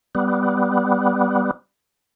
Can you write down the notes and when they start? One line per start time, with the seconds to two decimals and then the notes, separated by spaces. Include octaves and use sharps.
0.15 G3 B3